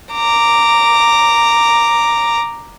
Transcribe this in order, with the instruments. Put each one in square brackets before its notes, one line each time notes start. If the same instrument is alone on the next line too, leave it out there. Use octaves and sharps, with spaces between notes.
[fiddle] A#5 D6